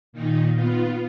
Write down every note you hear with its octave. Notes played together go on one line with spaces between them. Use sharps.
A#2 D#3 D#4
B3 F4